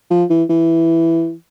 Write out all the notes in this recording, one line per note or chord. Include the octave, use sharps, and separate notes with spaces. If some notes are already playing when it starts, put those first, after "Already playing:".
F3
E3
E3